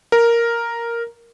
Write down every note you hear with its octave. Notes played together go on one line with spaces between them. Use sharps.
A#4